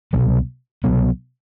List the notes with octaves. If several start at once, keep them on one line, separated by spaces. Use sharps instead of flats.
C2 B2 F#3 B3
C2 B2 F#3 B3